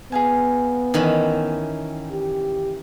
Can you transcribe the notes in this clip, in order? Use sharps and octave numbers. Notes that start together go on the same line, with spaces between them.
B3 G#4 F5 G#5
D#3 E3 C#4
G4